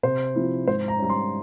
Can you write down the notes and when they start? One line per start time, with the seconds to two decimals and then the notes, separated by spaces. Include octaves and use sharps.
0.03 C3 C5
0.35 F3 C4 E4
0.67 G#2 C5
0.88 A#5
0.99 G3 C#4 A#5
1.10 C6